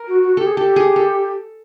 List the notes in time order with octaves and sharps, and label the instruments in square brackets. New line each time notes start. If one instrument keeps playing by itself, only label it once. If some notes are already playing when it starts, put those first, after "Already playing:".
Already playing: [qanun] A#4
[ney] F#4
F#4
[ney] G4 [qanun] A4
[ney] G#4
[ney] G4 [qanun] A4
[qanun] G#4
A4